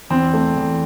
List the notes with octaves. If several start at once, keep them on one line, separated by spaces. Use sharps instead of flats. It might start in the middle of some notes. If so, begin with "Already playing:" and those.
E2 C4
A3
E2